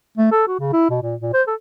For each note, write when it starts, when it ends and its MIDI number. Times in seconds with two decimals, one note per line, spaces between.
0.17 0.29 57
0.31 0.46 69
0.48 0.58 66
0.59 0.69 49
0.73 0.89 64
0.90 0.98 47
1.02 1.15 46
1.21 1.33 46
1.33 1.42 72
1.47 1.54 69